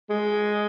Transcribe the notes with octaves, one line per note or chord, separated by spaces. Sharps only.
G#3